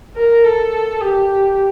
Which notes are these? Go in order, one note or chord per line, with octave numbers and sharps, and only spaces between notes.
A#4
A4
G4